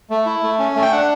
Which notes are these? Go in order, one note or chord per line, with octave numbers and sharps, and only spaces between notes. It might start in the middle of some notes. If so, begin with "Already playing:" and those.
A3
E4
A3
C#4
A3
G5
D4 F#5